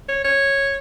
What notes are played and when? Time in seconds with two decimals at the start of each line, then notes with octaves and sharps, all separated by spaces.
0.09 C#5
0.24 C#5